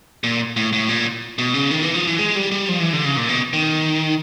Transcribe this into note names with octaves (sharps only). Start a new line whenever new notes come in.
A#2
A2
A2
A#2
B2
C#3
D#3
E3
F3
E3
G#3
G3
G3
F3
E3
D3
C#3
A#2
B2
D#3